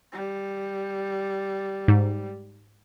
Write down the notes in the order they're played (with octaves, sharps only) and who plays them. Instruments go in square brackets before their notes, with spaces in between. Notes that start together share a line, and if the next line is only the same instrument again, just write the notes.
[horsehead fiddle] G3
[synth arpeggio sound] G#2